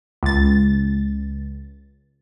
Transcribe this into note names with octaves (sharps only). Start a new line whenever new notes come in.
C#2 A6